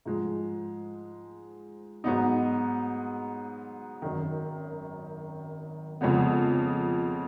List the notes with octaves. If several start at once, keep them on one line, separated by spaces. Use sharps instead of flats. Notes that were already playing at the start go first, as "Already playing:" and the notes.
G#2 F3 G#3
G#2 F#3 B3 D#4
G#1 F#2 D#3
F2 C#3 G#3 B3